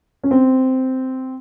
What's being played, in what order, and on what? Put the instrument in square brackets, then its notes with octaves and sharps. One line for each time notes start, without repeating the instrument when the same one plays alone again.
[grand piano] C#4
C4